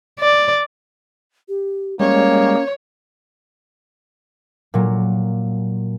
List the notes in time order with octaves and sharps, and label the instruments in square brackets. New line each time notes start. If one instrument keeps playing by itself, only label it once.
[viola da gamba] D5
[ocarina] G4
[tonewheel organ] G3 G#3 [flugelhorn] A#3 [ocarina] C#4 [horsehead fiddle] C#5
[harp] A#2 F#3